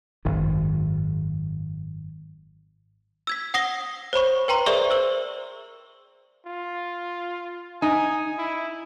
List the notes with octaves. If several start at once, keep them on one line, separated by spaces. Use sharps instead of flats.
G#1 F#2 D#3
E6 G#6 B6
F#5 D#6 A#6 C7 G7
C5 C#5 B5 C#6
B4 G5 A#5 C6
G#4 A#4 C5 D5 E5 C#6
C5 E6 F#7
F4
D#4 G#5
E4